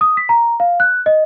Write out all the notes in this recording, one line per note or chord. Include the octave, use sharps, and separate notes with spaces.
D#6
B6
A#5
F5
F#6
D#5